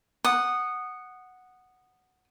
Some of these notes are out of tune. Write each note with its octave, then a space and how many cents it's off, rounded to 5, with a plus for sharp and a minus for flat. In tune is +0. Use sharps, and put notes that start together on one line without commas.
F#5 +0 D#6 -15